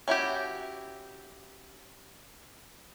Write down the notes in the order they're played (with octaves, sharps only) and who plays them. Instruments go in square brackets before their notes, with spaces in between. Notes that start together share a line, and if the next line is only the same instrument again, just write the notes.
[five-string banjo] C#4 E4 F#4 G4